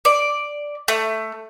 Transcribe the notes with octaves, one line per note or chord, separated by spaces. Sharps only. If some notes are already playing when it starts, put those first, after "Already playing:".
D5
A3